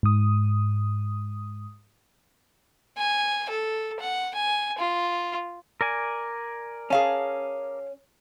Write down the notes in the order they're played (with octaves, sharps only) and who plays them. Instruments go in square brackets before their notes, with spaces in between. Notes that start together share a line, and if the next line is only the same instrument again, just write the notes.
[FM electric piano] G#2 D#6
[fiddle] G#5
A4
F#5
G#5
F4
[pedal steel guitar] A#4 D5 G#5
[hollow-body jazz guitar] C#4 [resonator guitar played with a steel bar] G#4 F5 A5